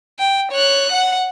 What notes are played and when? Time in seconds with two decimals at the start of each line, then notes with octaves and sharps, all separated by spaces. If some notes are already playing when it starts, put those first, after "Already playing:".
0.19 G5
0.52 C#5 F#6
0.92 F#5